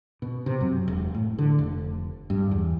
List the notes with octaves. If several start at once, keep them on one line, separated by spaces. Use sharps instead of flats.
B2
C3
F#2
E1
A2
D3
F1
G2
E2